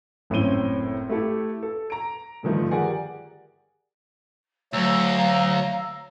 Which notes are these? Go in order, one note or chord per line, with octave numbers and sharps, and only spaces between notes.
F#1 A2 C4 C#4 D#7 G7
A3 E4 G4 A4
A4
A#5 D7
G2 D3 D#3 F3 A3
G4 G#4 A#4 D5 F#5 G#5
D2 F#3 A3 F5 A#5 E6